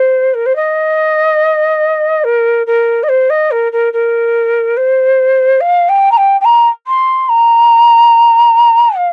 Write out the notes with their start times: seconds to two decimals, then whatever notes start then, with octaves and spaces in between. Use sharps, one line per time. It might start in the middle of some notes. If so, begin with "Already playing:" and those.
Already playing: C5
0.34 A#4
0.46 C5
0.55 D#5
2.24 A#4
2.66 A#4
3.03 D#5
3.08 C5
3.29 D#5
3.51 A#4
3.72 A#4
3.93 A#4
4.76 C5
5.60 F5
5.88 G5
6.11 A#5
6.17 G5
6.40 G5
6.44 A#5
6.87 C6
7.29 A#5
8.97 F5